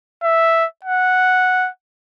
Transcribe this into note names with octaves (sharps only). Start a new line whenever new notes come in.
E5
F#5